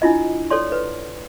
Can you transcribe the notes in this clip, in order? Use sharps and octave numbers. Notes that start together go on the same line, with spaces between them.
D4 E4 F4 D#5
A4 C#5 D5 C6
B4